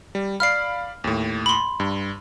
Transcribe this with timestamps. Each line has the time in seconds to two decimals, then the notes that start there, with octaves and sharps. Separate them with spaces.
0.15 G3
0.40 D5 F5 B5 F6 C7
1.04 D#2 A2
1.46 B5 C6
1.80 G2